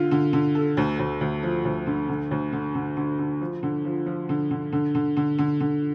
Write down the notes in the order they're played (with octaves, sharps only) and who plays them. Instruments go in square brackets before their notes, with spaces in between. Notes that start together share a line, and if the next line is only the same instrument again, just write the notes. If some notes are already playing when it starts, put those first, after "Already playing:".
Already playing: [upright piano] D3 F4
D3
D3
A4
D2
D2
D2
F3
D2
D3
D3
D2
D3
D3
D3
D3
F3
D3
F3
F3
D3
D3
D3
D3
D3
D3
D3